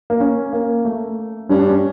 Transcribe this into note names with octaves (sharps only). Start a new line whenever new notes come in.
A#3
C#4
A#3
A3
G2 C#4
D4
C#4